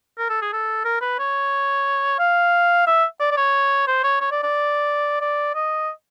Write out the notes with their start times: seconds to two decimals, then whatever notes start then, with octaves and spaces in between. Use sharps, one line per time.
0.18 A#4
0.30 A4
0.42 G#4
0.53 A4
0.85 A#4
1.01 B4
1.19 C#5
2.19 F5
2.87 E5
3.20 D5
3.31 D5
3.37 C#5
3.87 C5
4.04 C#5
4.21 C#5
4.31 D5
4.43 D5
5.21 D5
5.55 D#5